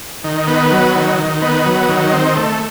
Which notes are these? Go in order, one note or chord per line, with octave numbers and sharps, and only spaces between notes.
D#3
B3
F#3
D#3
D#3
B3
F#3
D#3
C4
A3